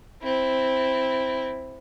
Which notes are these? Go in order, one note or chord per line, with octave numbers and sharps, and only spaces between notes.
C4 E4